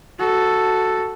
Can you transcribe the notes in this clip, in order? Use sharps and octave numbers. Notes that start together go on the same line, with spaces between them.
F#4 A4